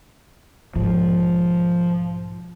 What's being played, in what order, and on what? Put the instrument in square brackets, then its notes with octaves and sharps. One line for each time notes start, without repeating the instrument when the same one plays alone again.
[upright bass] B1 G#2 [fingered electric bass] F3